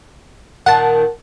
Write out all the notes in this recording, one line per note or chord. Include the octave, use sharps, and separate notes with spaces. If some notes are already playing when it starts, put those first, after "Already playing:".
A#2 D#3 F#5 A5